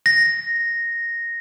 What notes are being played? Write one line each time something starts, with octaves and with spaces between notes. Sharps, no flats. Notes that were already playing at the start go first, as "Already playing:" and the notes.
A#6